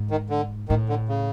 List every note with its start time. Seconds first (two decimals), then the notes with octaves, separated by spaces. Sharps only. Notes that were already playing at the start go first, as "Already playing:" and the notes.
Already playing: G#2
0.11 D#3
0.30 D3
0.69 A2 D#3
0.89 D3
1.09 C#3